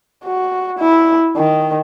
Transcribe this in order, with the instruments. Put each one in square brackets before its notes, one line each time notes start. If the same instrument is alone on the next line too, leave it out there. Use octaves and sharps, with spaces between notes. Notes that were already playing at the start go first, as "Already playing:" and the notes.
[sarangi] F#4
E4
D#3